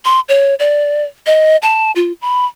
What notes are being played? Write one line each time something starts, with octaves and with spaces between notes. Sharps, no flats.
C6
C#5
D5
D#5
A5
F4
B5